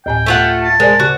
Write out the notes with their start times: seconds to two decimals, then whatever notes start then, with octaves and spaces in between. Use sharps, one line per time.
0.06 D2 A2 G5 G#5
0.26 A3 F4 F#5
0.64 A5
0.80 G#3 A#4 C5 D5
1.00 C#3 F#4